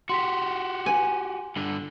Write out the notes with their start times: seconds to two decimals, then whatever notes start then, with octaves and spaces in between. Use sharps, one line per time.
0.09 F#4 G4 C6 B6
0.86 G#5
1.56 G2 D3